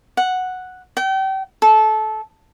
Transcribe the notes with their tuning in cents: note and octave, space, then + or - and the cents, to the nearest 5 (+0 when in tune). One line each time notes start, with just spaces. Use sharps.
F#5 -5
G5 -35
A4 -20